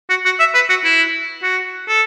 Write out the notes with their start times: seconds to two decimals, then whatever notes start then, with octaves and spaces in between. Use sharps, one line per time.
0.10 F#4
0.25 F#4
0.39 E5
0.55 B4
0.70 F#4
0.85 E4
1.43 F#4
1.88 A4